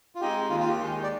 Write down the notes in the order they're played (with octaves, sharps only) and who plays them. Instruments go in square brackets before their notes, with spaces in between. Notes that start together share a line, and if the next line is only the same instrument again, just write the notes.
[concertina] F4
[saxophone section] G#3 C4 D#4 [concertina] G4
[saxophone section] D#2 [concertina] F4
[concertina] F4
G4
[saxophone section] D#3 G#3 D#4
[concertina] D5